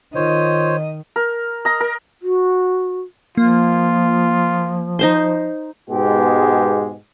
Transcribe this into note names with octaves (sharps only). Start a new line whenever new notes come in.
D#3 F4 C5 C#5 D#5
A#4
D#5 A#5
A#4
F#4
F3 A#3 F4
D#4 C5 C6
G#2 B2 G#3 B3 G4